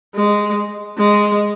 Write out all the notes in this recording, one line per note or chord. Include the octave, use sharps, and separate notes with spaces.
G#3
G#3